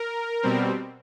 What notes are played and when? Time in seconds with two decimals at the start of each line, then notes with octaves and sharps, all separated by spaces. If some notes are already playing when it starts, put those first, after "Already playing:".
Already playing: A#4
0.43 B2 G3 C4